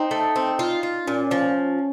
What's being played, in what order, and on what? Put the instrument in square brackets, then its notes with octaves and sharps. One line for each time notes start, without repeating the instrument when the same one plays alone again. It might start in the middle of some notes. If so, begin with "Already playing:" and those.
Already playing: [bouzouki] C4 [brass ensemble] D#4
[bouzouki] A3
C4
F4
F4
[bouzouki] A#2 [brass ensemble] C#4
[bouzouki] F3